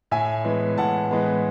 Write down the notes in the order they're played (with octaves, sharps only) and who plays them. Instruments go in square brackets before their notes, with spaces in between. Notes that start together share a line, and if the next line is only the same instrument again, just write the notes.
[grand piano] A2 E5 G#5
E3 G#3 B3
A2 F#5 A5
E3 G#3 B3